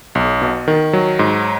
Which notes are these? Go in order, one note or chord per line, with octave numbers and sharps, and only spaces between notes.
B1
B2
D#3
F#3
G#2